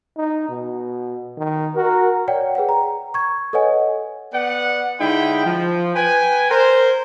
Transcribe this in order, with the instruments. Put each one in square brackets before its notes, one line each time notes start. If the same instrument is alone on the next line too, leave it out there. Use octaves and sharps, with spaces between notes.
[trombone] D#4
B2
D#3
[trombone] F#4 [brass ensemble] A#4
[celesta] C#5 D5 F#5 G5
G#4 B4 F#5 G5
A#5
C#6 G#6
A4 B4 C#5 D#5 F#5 G#5
[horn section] B3 D5 F#5
D3 G#3 D#4 E4 G5 B5
F3
B4 G5 G#5
A#4 C5